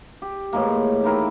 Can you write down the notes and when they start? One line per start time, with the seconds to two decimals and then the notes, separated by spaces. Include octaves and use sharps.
0.22 G4
0.53 A2 E3 G#3 A#3
1.04 D#3 E4 A#4